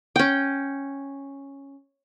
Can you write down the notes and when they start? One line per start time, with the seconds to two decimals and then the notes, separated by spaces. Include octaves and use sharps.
0.16 C#4 G5